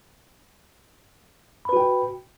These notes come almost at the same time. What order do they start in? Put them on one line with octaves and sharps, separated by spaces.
B5 B4 F#4 G5